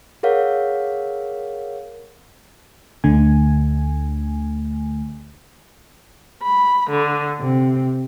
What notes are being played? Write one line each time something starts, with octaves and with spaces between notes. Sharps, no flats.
G#4 A#4 C#5 F5 F#5
D2 D3 A3 G#5
B5
D3
C3